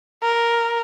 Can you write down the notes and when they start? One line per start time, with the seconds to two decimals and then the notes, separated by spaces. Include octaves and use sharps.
0.23 A#4